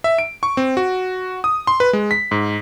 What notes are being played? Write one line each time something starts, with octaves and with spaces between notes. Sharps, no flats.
E5
D7
C#6
C4
F#4
D#6
C6
B4
G#3
B6
G#2